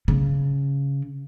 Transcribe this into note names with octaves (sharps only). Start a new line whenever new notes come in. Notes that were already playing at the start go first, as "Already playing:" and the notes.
C#3